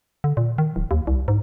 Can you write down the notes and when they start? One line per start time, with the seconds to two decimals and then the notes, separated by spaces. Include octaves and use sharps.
0.24 D3
0.37 A#2
0.58 D#3
0.76 D1
0.91 D#2
1.07 C2
1.28 G#2